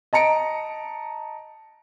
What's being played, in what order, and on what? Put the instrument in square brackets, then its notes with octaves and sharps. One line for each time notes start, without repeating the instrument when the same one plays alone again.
[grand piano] D#5 A5 A#5 C#7 D7